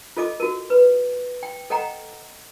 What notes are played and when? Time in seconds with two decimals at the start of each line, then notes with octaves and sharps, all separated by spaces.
0.17 F4 A4 D#5 D6
0.40 F#4 A#4
0.70 B4
1.43 G5
1.70 A4 D#5 F#5 G5 A#5